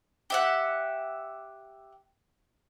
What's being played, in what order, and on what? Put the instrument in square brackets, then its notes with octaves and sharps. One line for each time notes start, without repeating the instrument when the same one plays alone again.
[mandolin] G4 E5 F#5